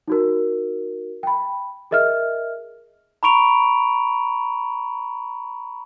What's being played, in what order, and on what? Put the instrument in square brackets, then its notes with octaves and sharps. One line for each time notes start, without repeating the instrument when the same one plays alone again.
[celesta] D#4 F#4 A#4
G5 B5
G#4 A#4 D#5 E5 F6
[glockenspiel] A#5 B5 C#6 D7 F7